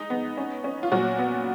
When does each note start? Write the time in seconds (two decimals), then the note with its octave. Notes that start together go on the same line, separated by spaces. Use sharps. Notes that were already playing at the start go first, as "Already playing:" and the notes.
Already playing: G#3 D#4
0.10 B3
0.37 C#4
0.64 C#4
0.83 F4
0.92 A#2 F#3 F#4
1.18 B3